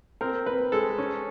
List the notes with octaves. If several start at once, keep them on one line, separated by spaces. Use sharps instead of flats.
C4 A#4
C4 B4
G#3 A4
C#4